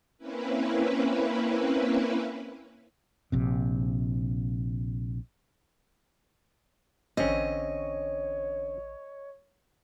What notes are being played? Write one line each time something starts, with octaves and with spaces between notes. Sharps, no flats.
A#3 C4 C#4 E4 B4
A#1 C3
A1 D3 C4 C#4 C#5 D#5